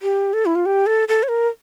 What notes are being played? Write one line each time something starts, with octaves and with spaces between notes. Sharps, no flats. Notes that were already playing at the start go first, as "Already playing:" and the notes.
G4
A4
E4
F4
G4
A4
A4
C#5
A#4